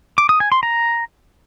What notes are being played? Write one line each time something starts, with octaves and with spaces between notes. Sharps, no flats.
D6
D#6
G#5
C6
A#5